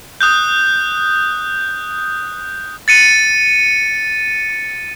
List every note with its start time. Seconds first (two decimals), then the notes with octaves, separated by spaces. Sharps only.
0.21 D#6 F#6 G6
2.88 A6 C#7 D#7